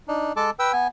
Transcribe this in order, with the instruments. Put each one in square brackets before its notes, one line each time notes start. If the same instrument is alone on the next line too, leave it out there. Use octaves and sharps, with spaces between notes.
[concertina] D4 D#4
G#3 A4 A5 D6
B4 G5 E6
B3 G#5